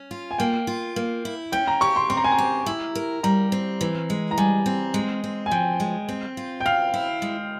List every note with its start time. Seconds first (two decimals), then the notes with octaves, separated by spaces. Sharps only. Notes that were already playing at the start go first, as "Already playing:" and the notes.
Already playing: C#4
0.11 F4
0.31 G#5
0.38 A#3 G5
0.67 F4
0.96 A#3
1.25 E4
1.52 C#4 G5
1.68 A#5
1.81 G4 C#6
1.96 C6
2.10 C4 C6
2.17 A#5
2.24 G#5
2.32 A#5
2.39 G4
2.66 E4
2.95 A#4
3.23 G3 A#5
3.52 C4
3.81 E3
4.10 G#3
4.31 A#5
4.38 G3 G#5
4.66 C4
4.94 G#3
5.24 C4
5.46 G#5
5.51 F3 G5
5.80 G#3
6.09 C4
6.37 F4
6.60 G5
6.66 C4 F5
6.94 E4
7.22 G#3